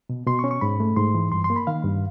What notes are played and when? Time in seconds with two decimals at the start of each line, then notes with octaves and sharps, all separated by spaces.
0.09 B2
0.27 B2 C6
0.39 C#6
0.44 C#4
0.51 C#6
0.61 G#2 B5
0.80 A3
0.96 G#2 C6
1.15 E3
1.32 G2 C6
1.44 C6
1.50 A#3
1.56 B5
1.67 D#3 F5
1.84 G2